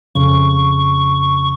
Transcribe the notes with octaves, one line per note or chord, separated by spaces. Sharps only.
F2 C#3 C#6